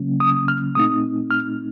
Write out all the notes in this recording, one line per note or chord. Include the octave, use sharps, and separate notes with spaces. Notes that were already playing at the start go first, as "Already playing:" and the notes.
Already playing: C#3 F#3 A#3 C#4
D#6
F6
A#2 A3 C4 D#4 D#6
F6